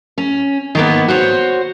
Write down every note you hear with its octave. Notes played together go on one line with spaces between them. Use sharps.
C#4
D#3 A#3 B3
F#4 C5 C#5